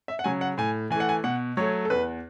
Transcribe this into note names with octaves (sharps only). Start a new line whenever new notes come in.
E5
F#5
C#3 F#3 G#5
F#5
A2 G#5
E3 G#5
A3 F#5
G#5
B2 F#5
F#3 A3 C#5
A4
E2 B4